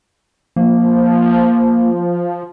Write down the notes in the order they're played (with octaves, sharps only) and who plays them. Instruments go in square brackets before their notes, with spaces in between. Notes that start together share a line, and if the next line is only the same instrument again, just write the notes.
[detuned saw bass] F3 [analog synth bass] A#3